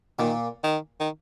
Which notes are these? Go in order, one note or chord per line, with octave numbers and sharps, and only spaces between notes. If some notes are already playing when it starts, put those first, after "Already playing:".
A#2 D#3
D#3
D#3